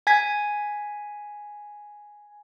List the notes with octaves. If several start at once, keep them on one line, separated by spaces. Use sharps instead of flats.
G#5 G#6 B6